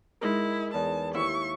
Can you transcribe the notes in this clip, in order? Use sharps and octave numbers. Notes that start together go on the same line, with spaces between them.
G#3 D#4 E4 A#4
E2 A5
D#2 E4 E5 C#6